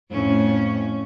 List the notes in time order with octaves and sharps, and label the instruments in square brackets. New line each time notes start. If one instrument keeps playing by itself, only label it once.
[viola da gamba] F2 A2 C#4